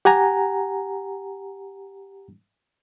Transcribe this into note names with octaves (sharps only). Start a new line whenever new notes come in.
G4 F#5 G#5 A#5